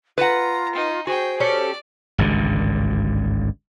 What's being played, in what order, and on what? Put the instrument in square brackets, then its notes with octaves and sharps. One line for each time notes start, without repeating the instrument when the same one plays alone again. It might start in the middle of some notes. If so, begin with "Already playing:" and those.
[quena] F4 [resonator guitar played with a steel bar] B4 F#5 [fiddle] A#5
[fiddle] D#4
[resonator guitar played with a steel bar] F#4 [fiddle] G#4 G5 [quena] C5
[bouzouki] C#4 G4 A4 [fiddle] D5
[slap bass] G#1 C#2 G2 D3